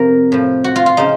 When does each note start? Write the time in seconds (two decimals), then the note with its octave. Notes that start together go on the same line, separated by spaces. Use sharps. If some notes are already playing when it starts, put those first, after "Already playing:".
Already playing: F2 C3 F3 A#4
0.32 A2 F3
0.64 F#4
0.76 F4
0.86 F4
0.97 C#3 F3 D#4